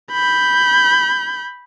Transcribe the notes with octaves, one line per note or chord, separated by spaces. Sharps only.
B5 G6